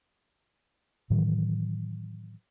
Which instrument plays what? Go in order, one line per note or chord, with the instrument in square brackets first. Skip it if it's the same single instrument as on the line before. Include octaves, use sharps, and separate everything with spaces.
[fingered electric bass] A2 D#3 E3 F#3